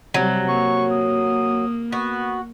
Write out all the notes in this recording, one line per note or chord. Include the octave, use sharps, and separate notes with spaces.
C3 F#3 G3
A#3 C#6
D#6
B3 F#4